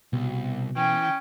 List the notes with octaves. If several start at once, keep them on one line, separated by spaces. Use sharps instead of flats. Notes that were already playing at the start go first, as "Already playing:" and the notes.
C2 B2
E3 C#4 G5